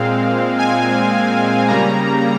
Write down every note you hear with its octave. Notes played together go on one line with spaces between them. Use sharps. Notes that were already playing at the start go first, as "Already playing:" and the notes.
Already playing: A#2 G#3 C4 F5
G#5
C#3 G3 A#3 A#5